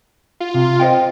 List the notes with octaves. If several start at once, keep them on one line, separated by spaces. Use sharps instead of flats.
F4
C3
C5 D#5 G5